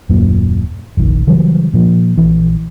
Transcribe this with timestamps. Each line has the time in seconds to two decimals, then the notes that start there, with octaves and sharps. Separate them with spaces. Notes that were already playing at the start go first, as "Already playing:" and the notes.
0.09 D#1 F#2 A#2
0.97 F1 A#1 D#3
1.27 C#3 E3 F#3 G3
1.74 A#2 F3
2.17 A#1 E3